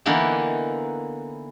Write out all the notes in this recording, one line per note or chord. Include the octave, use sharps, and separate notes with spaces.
D3 E3 A#3 B3 D#4 E4